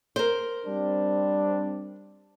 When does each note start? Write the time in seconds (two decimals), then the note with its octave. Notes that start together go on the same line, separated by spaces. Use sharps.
0.16 A#4 C5
0.66 G3 C4 D4